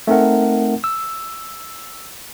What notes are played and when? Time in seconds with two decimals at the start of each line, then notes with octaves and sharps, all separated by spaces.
0.07 A3 C4 D#4 A#4 F#5
0.84 E6